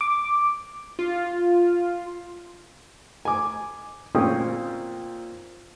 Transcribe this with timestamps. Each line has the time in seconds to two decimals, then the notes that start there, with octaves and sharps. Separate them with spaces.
0.01 D6
0.99 F4
3.25 G#5 D6
4.15 A#2 C4 C#4 G5 D#6